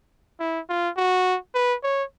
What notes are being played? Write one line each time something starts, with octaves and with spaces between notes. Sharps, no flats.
E4
F4
F#4
B4
C#5